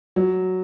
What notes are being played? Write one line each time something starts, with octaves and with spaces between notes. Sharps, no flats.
F#3